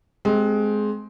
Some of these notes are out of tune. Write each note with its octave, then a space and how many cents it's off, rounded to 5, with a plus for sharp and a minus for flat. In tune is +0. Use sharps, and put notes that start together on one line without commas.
G#3 +20 C4 +0 G4 +0